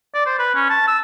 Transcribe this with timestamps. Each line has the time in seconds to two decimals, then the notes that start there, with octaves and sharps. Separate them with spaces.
0.15 D5
0.26 C5
0.39 B4
0.55 C#4
0.70 A5
0.88 E6